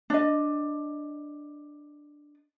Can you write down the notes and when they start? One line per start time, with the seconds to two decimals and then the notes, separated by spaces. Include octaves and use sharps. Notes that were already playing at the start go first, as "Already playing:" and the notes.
0.10 D4 D#5